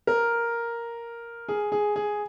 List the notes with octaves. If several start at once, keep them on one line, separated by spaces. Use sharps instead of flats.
A#4
G#4
G#4
G#4